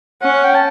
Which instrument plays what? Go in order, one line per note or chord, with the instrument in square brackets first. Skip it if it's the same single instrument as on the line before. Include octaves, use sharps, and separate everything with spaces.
[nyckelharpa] C#4 [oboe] F#5
[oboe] G5
A5